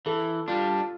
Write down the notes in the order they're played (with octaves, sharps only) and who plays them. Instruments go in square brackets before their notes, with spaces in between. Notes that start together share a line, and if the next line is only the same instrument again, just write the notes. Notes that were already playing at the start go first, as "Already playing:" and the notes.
[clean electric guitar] E3 [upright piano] A4
[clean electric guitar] G3 D4 [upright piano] F4